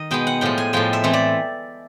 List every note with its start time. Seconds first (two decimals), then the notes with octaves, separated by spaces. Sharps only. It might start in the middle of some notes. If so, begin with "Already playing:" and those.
Already playing: D#3 D#5
0.11 B2 G#3 B3 G5
0.27 F#5
0.41 A2 F3 G#3 G5
0.58 G#5
0.73 A2 F3 G#3 G5
0.93 E5
1.04 E3 A3 C4
1.13 D5